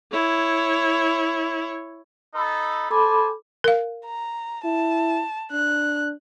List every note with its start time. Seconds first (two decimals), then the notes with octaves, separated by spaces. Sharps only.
0.12 E4 C#5
2.35 D#4 A4 B5
2.90 A4 C5 G#5 A5 B5 D6
3.64 A#4 F5
4.06 A#5
4.64 E4 A5
5.52 D4 F#6